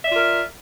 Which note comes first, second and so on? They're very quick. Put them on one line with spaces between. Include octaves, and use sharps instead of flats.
E5 D5 F4 A#4